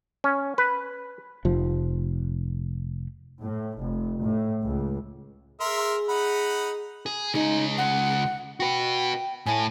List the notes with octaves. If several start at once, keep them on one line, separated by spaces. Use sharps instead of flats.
C#4
B4
F1 F3
A2
F1
A2
C#2
G#4 A#4 E5 C6
D#4 F#5 B5
G#4
C#2 D#4 G#4
F#5
F#4 B4 G5
A2 A3 G#5